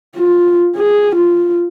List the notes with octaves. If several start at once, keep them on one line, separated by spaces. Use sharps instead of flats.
F4
G#4
F4